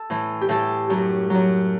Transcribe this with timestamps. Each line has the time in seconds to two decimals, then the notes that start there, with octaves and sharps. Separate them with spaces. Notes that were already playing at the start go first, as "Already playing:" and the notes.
Already playing: A4
0.10 A2 E3
0.41 G4
0.49 A2 E3 A4
0.90 F#2 F#3 G4
1.30 F#2 F#3